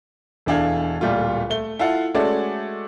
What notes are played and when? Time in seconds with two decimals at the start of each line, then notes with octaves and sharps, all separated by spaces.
0.46 E1 E3 D4 A4 F5 G#6
1.01 D1 A#2 G3 A3 F4
1.50 A3 G7
1.79 E4 F4 A4 F5 F#5
2.14 G#3 A3 C#4 F#4 A4 D5